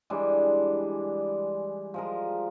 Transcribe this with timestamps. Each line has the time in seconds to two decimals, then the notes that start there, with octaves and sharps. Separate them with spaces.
0.10 E3 G3 G#3 D4
1.94 F3 G#3 A#4